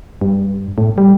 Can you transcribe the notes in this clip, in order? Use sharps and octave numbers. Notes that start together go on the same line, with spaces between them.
G2
A2
G3